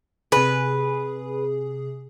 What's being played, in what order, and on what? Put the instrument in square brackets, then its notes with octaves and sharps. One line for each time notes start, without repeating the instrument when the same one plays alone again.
[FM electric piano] C3 G#4 [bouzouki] B4